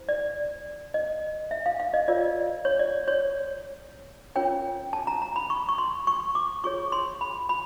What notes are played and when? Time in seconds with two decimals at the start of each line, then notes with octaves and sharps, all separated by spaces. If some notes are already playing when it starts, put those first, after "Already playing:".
Already playing: E4 C5
0.09 D5
0.94 D#5
1.51 E5
1.66 F5
1.80 F5
1.94 D#5
2.08 F4 A#4 C#5 D5
2.65 C#5
2.79 D5
3.08 C#5
4.35 C#4 F4 A#4 C#5 G5
4.93 A5
5.07 A#5
5.22 A#5
5.36 B5
5.50 C#6
5.69 C#6
5.78 C6
6.07 C#6
6.35 D6
6.64 F4 G#4 C#5 C#6
6.92 C6
7.21 B5
7.49 B5